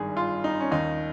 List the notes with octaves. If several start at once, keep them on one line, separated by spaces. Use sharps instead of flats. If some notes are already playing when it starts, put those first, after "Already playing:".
Already playing: G#1 G2 D#3 G#4
F4
D#4
C#4
D#2 D#3 D#4